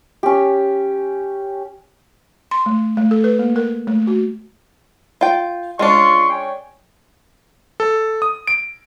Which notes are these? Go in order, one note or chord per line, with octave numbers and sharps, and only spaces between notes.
C#4 G4
C6
A3
A3
A4
B4
A#3
A#4
A3
F#4
F4 G5
G#3 C#4 D4 F4 C6 C#6
C#5 G5 G#5
A4
D#6
D7